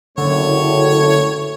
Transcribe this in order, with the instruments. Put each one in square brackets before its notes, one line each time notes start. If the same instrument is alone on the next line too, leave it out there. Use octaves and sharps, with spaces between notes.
[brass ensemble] F#1 A2 A3 [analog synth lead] D3 [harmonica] C#5